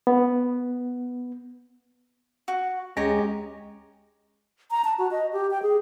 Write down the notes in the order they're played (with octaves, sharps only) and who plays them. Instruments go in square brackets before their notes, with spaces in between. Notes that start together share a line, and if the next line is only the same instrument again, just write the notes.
[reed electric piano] B3
[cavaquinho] F#4
[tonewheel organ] D2 C#4 D#5 [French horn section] G#3 [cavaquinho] G4 C#5 A#5
[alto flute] A#5
A5
F#4
D#5
G4
G5
G#4